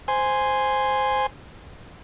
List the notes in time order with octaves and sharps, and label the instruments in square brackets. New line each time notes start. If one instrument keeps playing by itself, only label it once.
[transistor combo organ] C5 G#5